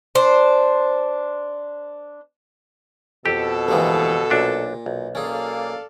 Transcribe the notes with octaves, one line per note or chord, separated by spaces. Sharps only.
D4 C5
F2 B2 G4 A4
G1 F2 E3 G#3 A#3
B1 A#2 D4 B4
B1
A#3 C#4 G#4 A4 D5 F5